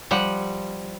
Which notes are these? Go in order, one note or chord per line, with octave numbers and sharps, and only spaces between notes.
F3 G3 F#5